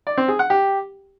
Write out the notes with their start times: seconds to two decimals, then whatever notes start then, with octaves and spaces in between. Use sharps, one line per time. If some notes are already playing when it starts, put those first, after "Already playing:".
0.07 D5
0.17 C4
0.28 G#4
0.39 F#5
0.50 G4